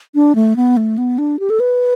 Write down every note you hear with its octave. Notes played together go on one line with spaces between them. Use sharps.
D4
A3
B3
A3
B3
D4
G4
A4
B4